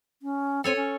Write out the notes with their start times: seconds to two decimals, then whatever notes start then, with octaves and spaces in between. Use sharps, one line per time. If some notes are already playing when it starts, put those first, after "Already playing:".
0.22 C#4
0.64 C4 A4 C#5 G#5
0.76 C#4